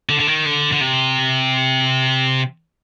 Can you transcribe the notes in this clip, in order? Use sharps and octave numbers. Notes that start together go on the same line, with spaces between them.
D3
D3
D#3
D3
D3
C3